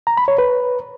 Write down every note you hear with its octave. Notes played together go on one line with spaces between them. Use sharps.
A#5
B5
C#5
B4